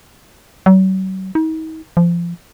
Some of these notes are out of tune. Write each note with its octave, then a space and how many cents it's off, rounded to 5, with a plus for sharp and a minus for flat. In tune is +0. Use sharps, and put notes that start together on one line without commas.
F#3 +40
D#4 +40
F3 -25